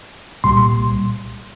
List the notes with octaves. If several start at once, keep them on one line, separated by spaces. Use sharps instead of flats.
C2 A#2 G3 C6